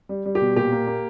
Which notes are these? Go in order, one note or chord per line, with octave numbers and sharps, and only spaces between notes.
G3
G3
G4
B2
A#2 G4
A#3
A#3